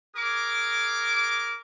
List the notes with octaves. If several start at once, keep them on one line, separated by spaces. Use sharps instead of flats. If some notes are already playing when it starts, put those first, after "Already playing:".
G#4 A#4 D6